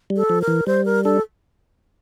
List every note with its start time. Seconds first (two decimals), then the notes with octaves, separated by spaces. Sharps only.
0.10 G3
0.16 A4
0.29 F3
0.42 A#4
0.48 E3
0.67 G3 C5
0.85 A#4
1.04 D4 A4